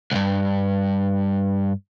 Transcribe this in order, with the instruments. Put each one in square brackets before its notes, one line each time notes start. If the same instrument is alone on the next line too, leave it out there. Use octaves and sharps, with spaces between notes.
[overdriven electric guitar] C2 G2